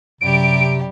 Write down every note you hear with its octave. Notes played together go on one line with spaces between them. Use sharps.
F#2 C3 G3 G4 D7